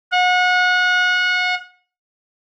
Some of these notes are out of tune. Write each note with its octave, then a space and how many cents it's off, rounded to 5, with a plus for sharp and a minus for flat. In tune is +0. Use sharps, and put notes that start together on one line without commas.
F#5 -30